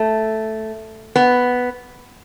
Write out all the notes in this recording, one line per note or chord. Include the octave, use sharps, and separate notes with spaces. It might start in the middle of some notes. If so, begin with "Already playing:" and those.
Already playing: A3
B3